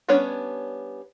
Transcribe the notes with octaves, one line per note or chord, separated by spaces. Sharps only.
G3 B3 C#4 D4 C#5